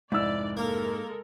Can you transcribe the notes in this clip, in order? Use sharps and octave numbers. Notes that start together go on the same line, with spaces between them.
F1 G#2 E4 D5 E6
G#3 A#3 A4 A#4